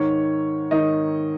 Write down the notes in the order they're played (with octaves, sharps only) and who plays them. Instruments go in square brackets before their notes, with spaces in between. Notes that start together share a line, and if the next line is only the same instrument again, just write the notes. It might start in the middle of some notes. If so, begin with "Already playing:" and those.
Already playing: [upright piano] G#2 D#3 C#5
G#2 D#3 D#5